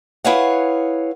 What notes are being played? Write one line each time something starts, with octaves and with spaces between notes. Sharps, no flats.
E4 G#4 B4 C#5 F5 F#5